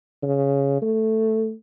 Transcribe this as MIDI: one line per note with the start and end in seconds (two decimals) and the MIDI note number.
0.23 0.78 49
0.82 1.53 57